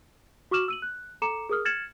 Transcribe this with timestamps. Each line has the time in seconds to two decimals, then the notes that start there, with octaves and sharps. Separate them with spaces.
0.51 F#4 C#6 D6 F6 E7 F#7
0.68 E6 D#7 F#7
0.82 F#6
1.22 A4 A#5 D6 C#7 E7
1.49 G#4 A#4 D#6 F6
1.65 F6 G#6 A6 C#7 E7 F#7